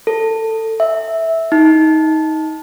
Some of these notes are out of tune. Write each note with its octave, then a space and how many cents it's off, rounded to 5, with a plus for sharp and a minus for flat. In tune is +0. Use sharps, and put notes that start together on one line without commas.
A4 +20
E5 -10
D#4 +20